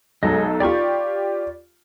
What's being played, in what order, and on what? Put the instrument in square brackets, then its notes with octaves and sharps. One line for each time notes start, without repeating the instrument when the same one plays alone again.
[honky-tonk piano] B1 F#3 A4 [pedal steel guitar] G#3 D#5
[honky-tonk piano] F4 G4 [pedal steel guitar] D5 B5 C#6